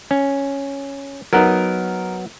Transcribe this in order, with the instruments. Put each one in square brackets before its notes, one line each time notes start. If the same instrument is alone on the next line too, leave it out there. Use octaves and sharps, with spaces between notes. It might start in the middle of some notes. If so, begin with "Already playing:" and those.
[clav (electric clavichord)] C#4
[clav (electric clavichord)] F#3 B3 [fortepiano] D#4 A#4